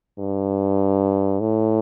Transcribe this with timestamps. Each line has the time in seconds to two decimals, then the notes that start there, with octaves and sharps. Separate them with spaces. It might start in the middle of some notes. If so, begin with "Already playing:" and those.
0.19 G2
1.40 A2